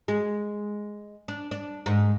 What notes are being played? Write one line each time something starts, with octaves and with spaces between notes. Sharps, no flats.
G#3
D4
D4
G#2